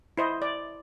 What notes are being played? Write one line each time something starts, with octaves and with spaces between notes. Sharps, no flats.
E4 C5 D#5
D5